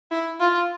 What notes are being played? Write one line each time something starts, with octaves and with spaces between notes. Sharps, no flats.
E4
F4